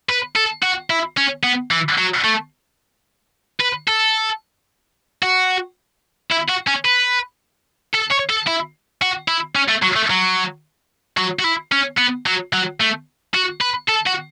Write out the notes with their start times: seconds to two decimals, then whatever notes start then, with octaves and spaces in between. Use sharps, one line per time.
0.09 B4
0.36 A4
0.63 F#4
0.90 E4
1.17 C#4
1.43 B3
1.71 E3
1.98 F#3
2.25 A3
3.60 B4
3.88 A4
5.23 F#4
6.31 E4
6.48 F#4
6.67 C#4
6.85 B4
7.94 A4
8.11 C#5
8.30 A4
8.47 E4
9.02 F#4
9.28 E4
9.55 C#4
9.68 A3
9.82 F#3
9.96 A3
10.10 F#3
11.17 F#3
11.39 F#4
11.44 E4
11.72 C#4
11.98 B3
12.26 F#3
12.53 F#3
12.80 A3
13.34 F#4
13.61 B4
13.88 A4
14.06 F#4